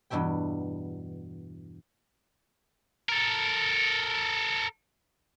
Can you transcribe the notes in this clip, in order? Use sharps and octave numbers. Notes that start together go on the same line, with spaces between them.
E2 G2 B2 E5 G5
A4 A#4